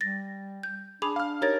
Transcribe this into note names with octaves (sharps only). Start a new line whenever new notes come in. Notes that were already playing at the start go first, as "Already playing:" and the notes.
G3 A6 A#6
G6
D4 G#4 B5 D6 F7
F5 F6
D#4 G4 A#4 C#5 A6